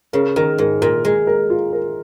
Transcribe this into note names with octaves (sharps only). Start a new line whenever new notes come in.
C#3 A#4
D#3 A#4
G#2 A#4
A#2 A#4
G#3 A#4
A#4
F4
A#4